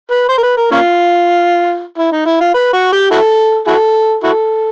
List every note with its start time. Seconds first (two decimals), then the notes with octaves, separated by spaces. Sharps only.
0.11 B4
0.29 C5
0.38 A#4
0.43 B4
0.57 A#4
0.71 A#3 C#4 F4
1.98 E4
2.12 D#4
2.26 E4
2.41 F4
2.54 B4
2.73 F#4
2.92 G4
3.11 E4 F#4 A4
3.67 E4 F#4 A4
4.23 E4 F#4 A4